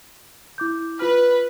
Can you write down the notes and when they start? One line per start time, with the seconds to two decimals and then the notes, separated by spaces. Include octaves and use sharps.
0.58 E4 D6 G6
0.99 F4 B4 B5 F6